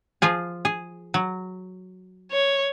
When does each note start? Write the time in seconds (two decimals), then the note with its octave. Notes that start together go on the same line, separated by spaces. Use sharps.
0.22 F3 F4 G#4
0.65 G#4
1.14 F#3
2.32 C#5